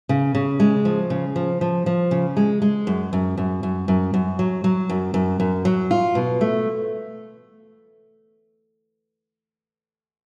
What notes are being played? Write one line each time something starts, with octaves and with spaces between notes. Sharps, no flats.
C#3
C#3
G#3
F3
C#3
F3
F3
F3
C#3
G#3
G#3
F#2
F#2
F#2
F#2
F#2
F#2
F#3
F#3
F#2
F#2
F#2
F#3
F4
B2
A3